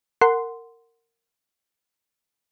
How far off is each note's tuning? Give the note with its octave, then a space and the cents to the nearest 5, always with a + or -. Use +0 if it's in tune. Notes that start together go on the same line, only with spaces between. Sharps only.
A#4 -20 F#5 +0 C6 -10